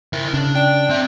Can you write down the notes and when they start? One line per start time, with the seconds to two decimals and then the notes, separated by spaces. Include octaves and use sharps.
0.13 E4 A#4
0.34 C#3 D4
0.55 D4 G5
0.89 C4 E5